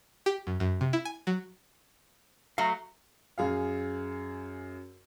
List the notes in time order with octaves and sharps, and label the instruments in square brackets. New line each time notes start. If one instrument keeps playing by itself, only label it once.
[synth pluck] G4
F#2
F#2
C3
E4
G#5
F#3
[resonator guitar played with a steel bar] F#3 A3 [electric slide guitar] F5 A#5
[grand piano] F#2 G#4 F5